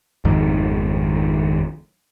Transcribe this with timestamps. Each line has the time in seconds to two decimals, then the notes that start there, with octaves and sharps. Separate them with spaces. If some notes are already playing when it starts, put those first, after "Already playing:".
0.25 G#1 F2 G#2 D#3